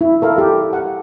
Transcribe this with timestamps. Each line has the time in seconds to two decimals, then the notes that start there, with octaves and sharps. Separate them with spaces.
0.01 E4
0.22 A4 A#4 F5
0.38 G4
0.73 F#5 A5